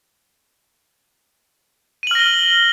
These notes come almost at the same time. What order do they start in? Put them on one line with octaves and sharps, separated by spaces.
D#7 F#7 F6 A#6 G7